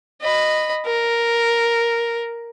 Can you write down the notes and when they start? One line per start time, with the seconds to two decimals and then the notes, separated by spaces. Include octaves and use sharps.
0.22 D#5 B5
0.86 A#4